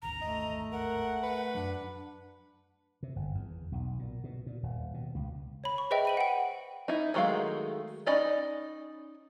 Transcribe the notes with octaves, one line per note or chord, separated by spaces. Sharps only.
D1 G#1 D#2 A#5
A3 D#5
A#4 F#5
B4
F#2 F#3 D4
C3
G1
E2
B1
A#2
B2
A#2
D#1
B2
C#2
C#5 B5
C#6
G#4 B4 C5 D#5 E5 G5
B5 D#7 F#7
F#5 G5
D#4 E4
D#3 F#3 G#3 A3 F5
C#4 D#4 D5 D#5 B5